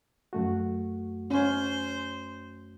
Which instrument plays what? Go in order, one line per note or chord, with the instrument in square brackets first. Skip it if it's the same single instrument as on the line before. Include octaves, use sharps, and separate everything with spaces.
[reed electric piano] F#2 A3 F#4
[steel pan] C#4 [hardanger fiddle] C5